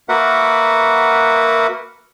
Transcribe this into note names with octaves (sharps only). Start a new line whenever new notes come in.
A#3 F#4 A#4 B4 E5 F#5